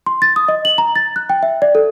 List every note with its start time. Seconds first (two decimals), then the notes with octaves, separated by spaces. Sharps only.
0.06 C6
0.22 A6
0.36 D#6
0.48 D#5
0.65 F#7
0.78 A#5
0.96 A6
1.16 F#6
1.30 G5
1.43 E5
1.62 D5
1.75 A4